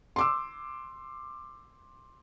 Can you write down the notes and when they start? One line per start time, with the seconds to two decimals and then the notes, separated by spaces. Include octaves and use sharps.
0.16 C6 D6 E6